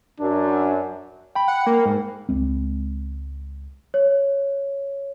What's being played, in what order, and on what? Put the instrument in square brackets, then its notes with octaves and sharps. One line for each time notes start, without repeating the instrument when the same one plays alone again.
[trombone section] F#2 [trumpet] D4
[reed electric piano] G5 B5
[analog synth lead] F#5
A#3
G#2
[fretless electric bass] C#2 G#3 C4
[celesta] C#5